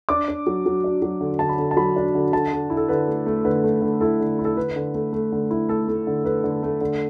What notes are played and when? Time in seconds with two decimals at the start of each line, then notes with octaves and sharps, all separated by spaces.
0.09 D4 D6
0.28 D4
0.47 F#3
0.66 F#3
0.84 D4
1.02 F#3
1.21 D3
1.39 D3 A5
1.49 B5
1.58 D3
1.71 A5
1.77 F#3 B5
1.96 D4
2.15 D3
2.33 D3 A5
2.52 D3
2.70 E4
2.77 A4
2.89 D3 B4
3.08 A3
3.26 A3
3.45 D3 B4
3.64 A3
3.82 D3
4.01 E4 A4
4.20 D3
4.39 E4
4.45 A4
4.57 D3 B4
4.76 D3
4.94 A3
5.12 A3
5.32 D3
5.51 E4
5.68 A3 A4
5.88 A3
6.07 D3
6.24 D3 B4
6.44 D3
6.63 A3
6.81 D3